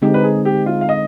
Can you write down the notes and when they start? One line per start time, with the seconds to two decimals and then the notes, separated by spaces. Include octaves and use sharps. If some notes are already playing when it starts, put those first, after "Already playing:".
0.02 D3 G#3 C4 D#4 G4
0.14 B4
0.24 G#4
0.45 G4
0.66 F4
0.81 F5
0.89 D#5